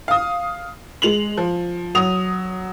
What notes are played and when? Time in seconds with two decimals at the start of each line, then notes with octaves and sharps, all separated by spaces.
0.08 F5 D#6
1.02 G#3 F7 F#7
1.38 F3
1.95 F#3 D#6 F7